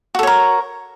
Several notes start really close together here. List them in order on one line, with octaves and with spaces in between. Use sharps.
F#4 A4 C#5 A#4